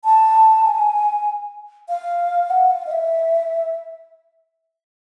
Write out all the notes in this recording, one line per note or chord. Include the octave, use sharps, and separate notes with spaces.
A5
G#5
F5
F#5
F5
D#5
E5